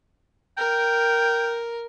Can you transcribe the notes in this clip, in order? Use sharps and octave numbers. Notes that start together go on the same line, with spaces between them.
A#4 G5